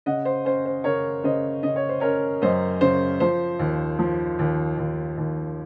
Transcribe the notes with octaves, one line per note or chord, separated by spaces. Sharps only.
C#3 D#5 F#5
C5
C#4 C5
C5
C#3 A#4 C#5
C#3 C5 D#5
C#3 D#5
C#5
C5
C#4 A#4 C#5
F#2 C5 D#5
C#3 C5
F3 C5
D#2
F3
D#2
D#2
D#2